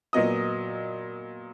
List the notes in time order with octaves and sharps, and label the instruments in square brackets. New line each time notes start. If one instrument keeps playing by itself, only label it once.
[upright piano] A#2 F#3 B3 D#5 D#6